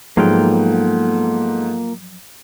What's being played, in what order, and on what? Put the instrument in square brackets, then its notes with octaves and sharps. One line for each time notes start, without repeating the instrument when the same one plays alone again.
[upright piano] G#2 [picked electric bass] F3 F#3 [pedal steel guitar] A#3 F4 G5 [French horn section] B3 A4